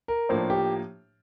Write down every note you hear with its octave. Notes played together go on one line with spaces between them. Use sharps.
A#4
A2 F3 A#3 D4 C5
G4